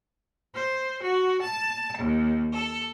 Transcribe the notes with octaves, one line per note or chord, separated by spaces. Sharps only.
C5
F#4
A5
D#2
A4